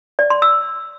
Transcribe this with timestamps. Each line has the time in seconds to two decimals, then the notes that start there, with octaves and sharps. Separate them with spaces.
0.19 D5
0.30 C6
0.42 E6